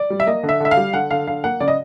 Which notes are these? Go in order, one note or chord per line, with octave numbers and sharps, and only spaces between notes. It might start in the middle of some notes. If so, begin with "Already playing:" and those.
Already playing: D5
G3
E5
A#3 D#5
D3
E5
D3 E5
F5
G3
D3 F#5
D3 F5
D3 F5
A#3 F#5
C#3 D5
D#5